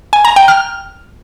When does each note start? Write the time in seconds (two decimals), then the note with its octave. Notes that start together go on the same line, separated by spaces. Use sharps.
0.13 G#5
0.25 A#5
0.36 G5
0.48 F6